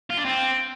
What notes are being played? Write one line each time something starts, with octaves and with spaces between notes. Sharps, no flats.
F4
D4
C4